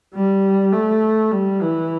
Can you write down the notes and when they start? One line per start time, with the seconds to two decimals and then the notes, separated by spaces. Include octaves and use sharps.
0.15 G3
0.73 A3
1.31 G3
1.62 E3